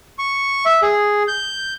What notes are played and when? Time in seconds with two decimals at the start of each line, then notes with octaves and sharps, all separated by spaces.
0.19 C#6
0.66 E5
0.82 G#4
1.28 G6